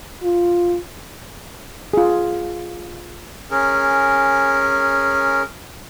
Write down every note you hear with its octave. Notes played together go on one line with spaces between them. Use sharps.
F4
F4 G#4
C#4 G#4 A#4